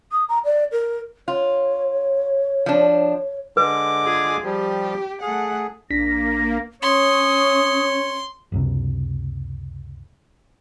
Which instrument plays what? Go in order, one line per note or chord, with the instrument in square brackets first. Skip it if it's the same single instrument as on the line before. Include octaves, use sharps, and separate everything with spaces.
[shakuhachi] D#6
A#5
D5
A#4
[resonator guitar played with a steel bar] F4 [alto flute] C#5
[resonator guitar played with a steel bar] F3 D4
[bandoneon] D3 G#3 D6 [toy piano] B4
[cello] F4 G#4
[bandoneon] F3 G3 [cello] G4
[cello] A3 F#5 [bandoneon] G#4
[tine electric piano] A#1 D4 B6 [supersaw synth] A#3 [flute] A#6
[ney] C#4 [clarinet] C#5 [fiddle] C6 [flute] D#6
[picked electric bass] F#1 C#2 C3